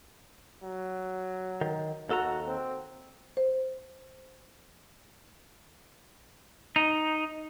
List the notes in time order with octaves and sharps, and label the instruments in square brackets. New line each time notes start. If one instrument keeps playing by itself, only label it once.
[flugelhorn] F#3
[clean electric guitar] D#3
[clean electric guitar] D#2 A4 A#5 [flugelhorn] F#4
[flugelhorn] C4
[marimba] C5
[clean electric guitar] D#4